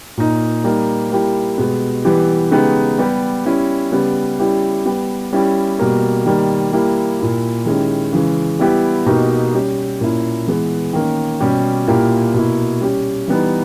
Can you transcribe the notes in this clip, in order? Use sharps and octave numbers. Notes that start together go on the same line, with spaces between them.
A#2 A#3 D#4
G3 A#3 D#4
G3 A#3 E4 G4
B2 G#3 B3 G4
E3 G3 B3 G4
C#3 G#3 B3 D#4 G4
G3 B3 G4
G3 C#4 E4
C#3 G3 B3 G4
G3 C#4 E4 G4
G3 B3 G4
G3 C#4 E4 G4
B2 G3 A#3
D#3 G3 A#3
G3 A#3 E4 G4
A#2 A#3 E4 G4
D#3 G#3 C#4 E4 G4
C#3 E3 G#3
G3 B3 E4 G4
B2 A#3 D#4 G4
G3 C#4 G4
A#2 A#3 C#4 E4
E3 G#3 B3
D#3 A#3 C#4
B2 G3 C#4 G4
A#2 A#3 E4 G4
B2 A#3 E4
G3 C#4 G4
E3 G3 B3 D#4